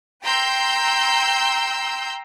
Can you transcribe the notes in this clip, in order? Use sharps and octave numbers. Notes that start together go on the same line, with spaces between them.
G5 A#5 C6 E6 G6